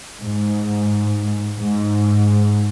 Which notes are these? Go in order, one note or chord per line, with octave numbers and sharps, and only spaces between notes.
G#2
G#2